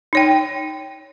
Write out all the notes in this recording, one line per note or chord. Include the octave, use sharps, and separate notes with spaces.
D#4 C#5 G5